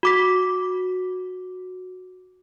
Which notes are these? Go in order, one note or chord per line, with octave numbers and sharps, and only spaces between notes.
F#4 D6 B6